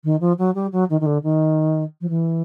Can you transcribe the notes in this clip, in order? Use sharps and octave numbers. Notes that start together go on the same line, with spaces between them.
D#3
F3
F#3
G3
F#3
D#3
D#3
D3
D#3
F3
E3